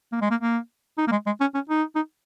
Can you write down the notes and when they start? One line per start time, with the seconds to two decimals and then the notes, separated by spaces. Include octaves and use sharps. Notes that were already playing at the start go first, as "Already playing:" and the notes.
0.12 A#3
0.21 G#3
0.30 A#3
0.41 A#3
0.98 D#4
1.07 A#3
1.12 G#3
1.26 G#3
1.41 C#4
1.55 C#4
1.69 D#4
1.95 D#4